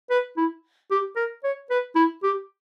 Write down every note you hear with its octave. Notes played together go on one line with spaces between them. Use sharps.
B4
E4
G4
A#4
C#5
B4
E4
G4